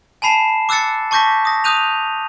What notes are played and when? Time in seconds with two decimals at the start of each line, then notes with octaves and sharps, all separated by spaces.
0.22 G#5 A5 B5 C7 E7
0.69 D6 E6 F#6 A6 C#7
1.11 A5 C#6 D6 G6 A#6 B6
1.45 D#6 A#6
1.64 D#6 F#6 G6 D#7 F7